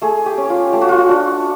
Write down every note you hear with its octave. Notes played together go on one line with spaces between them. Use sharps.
A3 G#4
G4
C#4
F4
A3 G4
F#4
F4
F#4
D4